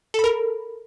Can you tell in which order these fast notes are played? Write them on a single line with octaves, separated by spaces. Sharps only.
A4 B5 A#4